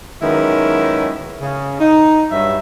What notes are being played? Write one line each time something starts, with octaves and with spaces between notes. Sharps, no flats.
D#3 F#3 G#3 B3 C#4 E4
C#3
D#4
G2 F#3 E5